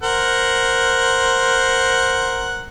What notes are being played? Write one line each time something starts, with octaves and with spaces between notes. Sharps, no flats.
A#4 C5 F#5